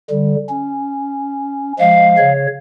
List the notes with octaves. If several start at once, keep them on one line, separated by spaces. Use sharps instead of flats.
D3 G3
C#4
F3 G#3 F5
C#3 C#5